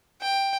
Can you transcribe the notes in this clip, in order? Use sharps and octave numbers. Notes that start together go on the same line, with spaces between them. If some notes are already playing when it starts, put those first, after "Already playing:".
G5